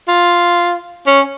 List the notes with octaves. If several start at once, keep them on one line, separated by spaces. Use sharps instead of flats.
F4
C#4